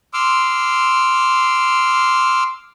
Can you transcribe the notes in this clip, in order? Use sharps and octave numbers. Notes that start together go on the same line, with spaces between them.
C6 D6 E6 F6